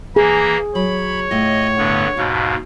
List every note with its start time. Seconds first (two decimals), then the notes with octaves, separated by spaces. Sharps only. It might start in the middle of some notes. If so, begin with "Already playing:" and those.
0.16 E3 A#3 G#4 A#5
0.75 F#3 C#5 B5
1.31 A2 F4 D#5
1.77 G2 D3 B3
2.17 D#2 G#2 B2 F5